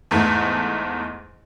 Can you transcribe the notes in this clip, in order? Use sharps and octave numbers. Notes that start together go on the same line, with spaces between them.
E2 G#2 A3